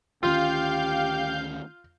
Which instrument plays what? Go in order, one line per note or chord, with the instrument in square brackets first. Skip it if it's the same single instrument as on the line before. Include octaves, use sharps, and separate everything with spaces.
[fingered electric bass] D2 D#3 C#4 [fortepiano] F4 [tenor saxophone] G4 [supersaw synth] F5 G6